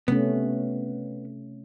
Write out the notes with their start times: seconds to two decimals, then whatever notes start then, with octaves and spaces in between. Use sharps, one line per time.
0.08 C3 A3 B3 C#4